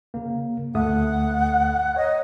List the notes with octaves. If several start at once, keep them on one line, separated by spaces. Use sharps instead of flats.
C#3 A#3
D2 A3 F#5 D#6
C#5 D#5